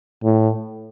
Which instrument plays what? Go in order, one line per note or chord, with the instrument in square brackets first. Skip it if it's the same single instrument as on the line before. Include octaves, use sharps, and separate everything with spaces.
[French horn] A2